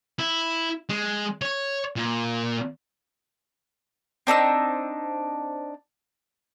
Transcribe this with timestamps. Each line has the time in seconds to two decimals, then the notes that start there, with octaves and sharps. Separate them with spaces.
0.19 E4
0.89 G#3
1.42 C#5
1.96 A#2
4.27 C4 D4 D#4 E6